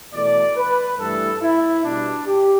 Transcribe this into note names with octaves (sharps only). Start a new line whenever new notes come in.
E2 B2 A3 D5
B4
G2 E3 A3 A4
E4
B2 G3 D4
G4